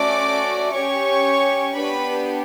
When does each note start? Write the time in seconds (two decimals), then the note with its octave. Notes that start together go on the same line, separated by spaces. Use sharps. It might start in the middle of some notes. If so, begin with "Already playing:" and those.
Already playing: A3 C#4 F#4 D5 D6
0.72 C#4 G4 C#5 C#6
1.75 B3 D4 G4 B4 B5